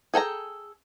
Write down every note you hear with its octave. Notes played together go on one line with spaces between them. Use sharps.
G#4 A4 G5 A#5